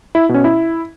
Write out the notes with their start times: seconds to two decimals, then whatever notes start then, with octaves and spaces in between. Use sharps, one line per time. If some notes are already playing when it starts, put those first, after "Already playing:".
0.15 E4
0.29 B2
0.34 C#4
0.44 E4